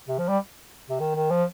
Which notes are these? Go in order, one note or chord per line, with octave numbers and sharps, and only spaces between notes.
C3
F3
G3
C3
D#3
D#3
F3